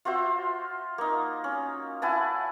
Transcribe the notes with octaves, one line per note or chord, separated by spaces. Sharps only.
F4 F#4 C5 E5
A#3 D#4
C#4
E4 F#5 G#5 A5